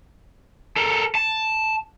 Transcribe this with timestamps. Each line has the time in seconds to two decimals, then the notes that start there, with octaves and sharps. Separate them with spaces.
0.76 A4 A#4
1.15 A5